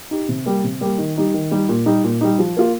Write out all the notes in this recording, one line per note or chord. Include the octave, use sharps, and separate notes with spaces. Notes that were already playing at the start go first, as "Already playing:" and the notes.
D#4 G4
C3
G3 A#3 G4
C3
G3 A#3 G4
D#3
G3 D#4 G4
D#3
G3 D#4 G4
A#2
G3 D#4
A#2
G3 D#4
F3
A#3 F4